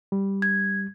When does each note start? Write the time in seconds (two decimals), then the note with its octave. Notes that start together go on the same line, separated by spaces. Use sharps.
0.12 G3
0.42 G#6